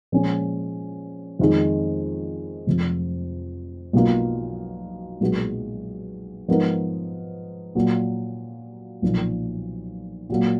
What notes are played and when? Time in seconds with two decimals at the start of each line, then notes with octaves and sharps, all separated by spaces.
0.12 A#2 F3 G#3 C#4
1.39 F2 D#3 G#3
2.66 F1 F2 F3
3.93 B1 B2 A#3 F4
5.21 B1 A#2 G#3 B3 F#4
6.48 G#2 F3 B3 D#4 A#4
7.75 A#2 F#3 A#3
9.02 B1 A#2 F3 A#3
10.30 A#2 F#3 A#3